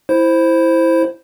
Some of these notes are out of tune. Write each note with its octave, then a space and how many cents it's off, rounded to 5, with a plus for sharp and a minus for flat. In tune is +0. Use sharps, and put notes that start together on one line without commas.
E4 +0 C5 +0